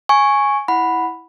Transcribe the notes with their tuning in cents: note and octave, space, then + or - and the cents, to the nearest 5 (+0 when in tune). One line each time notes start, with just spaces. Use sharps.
G#5 +0 C#6 -5
E4 +0 F#5 +0 B5 +0